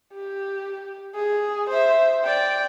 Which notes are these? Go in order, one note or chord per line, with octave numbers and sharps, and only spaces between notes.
G4
G#4
C5 E5
D5 G5